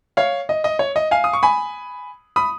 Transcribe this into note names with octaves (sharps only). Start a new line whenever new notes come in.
C#5 F5
D#5
D#5
C#5
D#5
F5 G#5
D#6
C#6
G#5 B5
B5 D#6